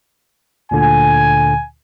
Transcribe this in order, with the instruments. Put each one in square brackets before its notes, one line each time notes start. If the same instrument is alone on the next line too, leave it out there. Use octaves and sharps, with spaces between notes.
[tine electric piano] D2 A#2 D3 [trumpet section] G#5